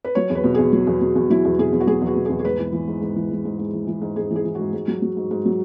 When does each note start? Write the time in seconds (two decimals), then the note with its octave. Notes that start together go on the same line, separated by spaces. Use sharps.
0.04 B4
0.15 F#3 C#5
0.30 E2
0.35 B4
0.44 B2
0.55 E2 G#4
0.72 F#3
0.87 E2
1.01 B2
1.15 E2
1.30 F#3 E4
1.45 E2
1.58 B2 G#4
1.72 E2
1.81 F#4
1.87 F#3 G#4
2.02 E2
2.07 F#4
2.16 B2
2.26 E2 G#4
2.39 G#4
2.45 G#2 B4
2.59 E3
2.73 E3
2.88 G#2
3.01 G#2
3.16 E3
3.31 E3
3.45 G#2
3.59 G#2
3.73 E3
3.87 E3
4.02 G#2
4.16 G#2 G#4
4.30 E3
4.36 G#4
4.45 E3
4.55 G#2 F#4
4.73 G#2
4.88 F#3
5.02 F#3
5.17 G#2
5.31 G#2
5.45 F#3